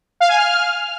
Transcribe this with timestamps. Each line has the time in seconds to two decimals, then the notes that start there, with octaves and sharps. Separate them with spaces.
0.20 F5
0.29 G#5
0.37 F6